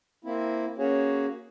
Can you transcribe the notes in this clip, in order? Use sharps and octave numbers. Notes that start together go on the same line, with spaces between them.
A#3 C4 E4
A#3 C#4 F#4 G#4 C#5